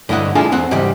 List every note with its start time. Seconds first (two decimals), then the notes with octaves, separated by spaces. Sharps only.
0.09 G2 D3 E4 D#5 F#5
0.35 G#3 D4 E4 F4 G#4 A4
0.52 E2 C4 F#5
0.71 G#2 C#3 E3 G3